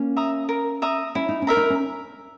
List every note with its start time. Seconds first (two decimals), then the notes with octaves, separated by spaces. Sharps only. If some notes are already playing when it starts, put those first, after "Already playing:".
Already playing: A#3 C#4
0.16 E5 A#5 D#6
0.49 A#4
0.82 E5 A#5 D#6
1.15 C#4 E4
1.29 D#4
1.42 C#4
1.47 A#4 E5 A#5
1.57 D#4
1.70 C#4